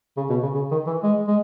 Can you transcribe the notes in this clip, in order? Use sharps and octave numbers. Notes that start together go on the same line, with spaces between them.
C#3
B2
C#3
C#3
D#3
E3
G#3
G#3